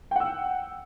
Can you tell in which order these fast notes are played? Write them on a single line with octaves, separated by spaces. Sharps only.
G5 F#5 E6